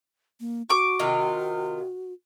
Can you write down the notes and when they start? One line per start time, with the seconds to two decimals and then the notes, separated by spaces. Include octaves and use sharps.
0.40 A#3
0.70 F#4 C#6 D6
0.99 C3 D#3 F4